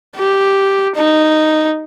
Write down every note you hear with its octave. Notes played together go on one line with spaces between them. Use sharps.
G4
D#4